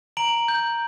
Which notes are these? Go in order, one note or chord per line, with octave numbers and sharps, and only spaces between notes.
A#5 D7 F#7
G6